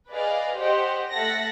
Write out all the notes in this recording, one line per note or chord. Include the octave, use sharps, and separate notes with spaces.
G#4 B4 D5 D#5 F5
G4 C5 D#5 F#5
A3 E5 F#5 A5 A#6